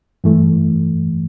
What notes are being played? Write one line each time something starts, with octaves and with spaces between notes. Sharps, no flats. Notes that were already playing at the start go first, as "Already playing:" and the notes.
G2 E3 A3